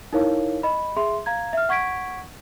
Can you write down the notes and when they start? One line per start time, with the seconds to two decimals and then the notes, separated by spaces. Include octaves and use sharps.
0.13 D#4 E4 A#4 C#5 F5
0.63 D#5 B5
0.97 G#4 E5 C6
1.26 F5 A#5 G#6
1.53 E5 F6
1.69 F#5 C#6 G#6 B6 D7